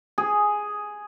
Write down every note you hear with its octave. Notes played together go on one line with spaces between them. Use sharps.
G#4